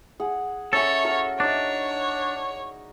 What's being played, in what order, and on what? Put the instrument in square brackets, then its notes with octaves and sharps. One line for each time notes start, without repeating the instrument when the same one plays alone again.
[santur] G#4 F#5
[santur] C#4 E5 A#5 [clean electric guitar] A4 [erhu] C#5
[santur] F#4 A#4
[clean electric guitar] D4 [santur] D#4 D5 D6 [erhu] C#5